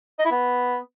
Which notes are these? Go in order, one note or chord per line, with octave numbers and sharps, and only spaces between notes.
D#5
E4
B3